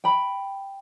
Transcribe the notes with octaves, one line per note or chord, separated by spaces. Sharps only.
G5 B5